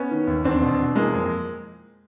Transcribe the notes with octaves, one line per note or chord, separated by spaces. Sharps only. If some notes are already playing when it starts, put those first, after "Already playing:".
Already playing: B3 C#4
D#3
D#2
E2 C4 D4
B2
B2
E3 G#3 A#3
F2